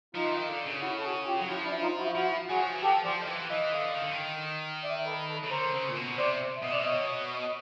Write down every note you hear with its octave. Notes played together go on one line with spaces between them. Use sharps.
F3 D#4 F4
E3
D#3
D3
C#3
E4 F#4
A4
F#4 G#4
F4 G4
F#3
F3 E4 F#4
D4 E4
D#4 F4
E4 F#4
F4
F3 E4 F#4
F#3 F#4 G#4
F3
E3
F3 G4 A4
F3 C5 D5
D#3
E3
E3 D#5 F5
D3
D#3
D3
D#3
D5 E5
A4 B4
A4 B4
C#3
D3 A#4 C5
C#3
A#2
B2
C3 C5 D5
E5
B2 D#5
C3 D5 E5
B2
C#5 D#5
D#5